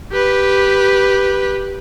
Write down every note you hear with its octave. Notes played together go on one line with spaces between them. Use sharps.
G4 B4